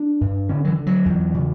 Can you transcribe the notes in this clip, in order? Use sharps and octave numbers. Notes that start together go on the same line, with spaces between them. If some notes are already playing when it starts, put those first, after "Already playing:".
Already playing: D4
G2
D3 C#4
F#3
E3
D3
F#3
E2
C#3